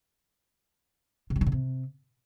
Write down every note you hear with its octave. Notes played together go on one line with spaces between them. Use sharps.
C3
G3
D3
A#2
C3